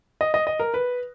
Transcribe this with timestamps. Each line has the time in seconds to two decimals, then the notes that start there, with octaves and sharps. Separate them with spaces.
0.21 D#5
0.34 D#5
0.47 D#5
0.60 A#4
0.74 B4